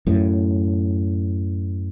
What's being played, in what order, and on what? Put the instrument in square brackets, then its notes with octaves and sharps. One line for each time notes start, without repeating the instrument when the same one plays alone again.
[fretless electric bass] F#2 A2